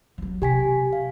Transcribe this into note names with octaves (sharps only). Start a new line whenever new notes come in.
F3 F#3
C3 G4 G#5 B6
F5